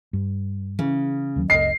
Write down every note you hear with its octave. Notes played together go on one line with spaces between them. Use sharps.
G2
C#3 E3
D#2 D#3 F#3
F#1 C#2 D#5 C7